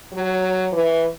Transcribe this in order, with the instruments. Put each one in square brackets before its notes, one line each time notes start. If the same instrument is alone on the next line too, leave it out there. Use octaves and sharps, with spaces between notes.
[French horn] F#3
E3